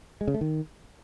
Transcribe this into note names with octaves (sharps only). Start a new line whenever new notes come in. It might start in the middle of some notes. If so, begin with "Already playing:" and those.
G#3
C#3
A3
D#3